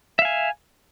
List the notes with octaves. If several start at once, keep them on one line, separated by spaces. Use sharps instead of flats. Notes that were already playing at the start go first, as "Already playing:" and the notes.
E5 F5 G#5